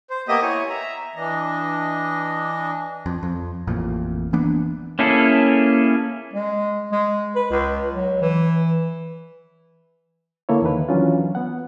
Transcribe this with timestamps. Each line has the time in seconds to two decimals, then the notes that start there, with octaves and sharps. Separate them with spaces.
0.10 C5
0.28 A#3 B3 G4 D#5 E5 D#6
0.42 E4 C#5 G#5
0.69 E5 A#5
1.15 E3 D4 D#5
3.06 F2
3.23 F2
3.67 A1 F2 A#2
4.33 E3 A#3 B3 D4
4.99 A#3 C#4 E4 G#4 A4
6.33 G#3
6.92 G#3
7.36 B4
7.51 C#2
7.93 F#3
8.22 E3
10.49 D3 A#3 E4 A4 C#5
10.62 E2 D#3 B4
10.89 E3 F#3 C#4 D4 F4
11.35 B3 F#5